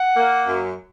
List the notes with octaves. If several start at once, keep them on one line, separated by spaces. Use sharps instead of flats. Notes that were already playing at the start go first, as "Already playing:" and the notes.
Already playing: F#5
A#3
F#2